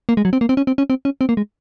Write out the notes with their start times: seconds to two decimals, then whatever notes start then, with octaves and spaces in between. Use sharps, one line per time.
0.09 A#3
0.17 G#3
0.25 F#3
0.33 C4
0.41 A#3
0.49 C4
0.57 C#4
0.67 C4
0.78 C#4
0.90 C4
1.05 C#4
1.21 C4
1.29 A#3
1.37 G#3